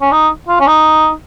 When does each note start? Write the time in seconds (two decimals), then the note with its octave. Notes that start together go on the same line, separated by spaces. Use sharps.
0.01 C#4
0.12 D#4
0.48 F4
0.60 C#4
0.67 D#4